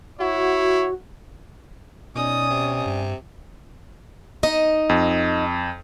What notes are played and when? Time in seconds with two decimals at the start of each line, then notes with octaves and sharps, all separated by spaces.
0.20 E4 F#4 C#5
2.15 B2 C#4 D#4 D5 G#5 D#6
2.50 C3
2.86 G2
4.43 D#4 D#5
4.89 F2